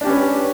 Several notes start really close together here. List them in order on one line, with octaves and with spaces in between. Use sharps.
D4 G4 C#4 B4 C#5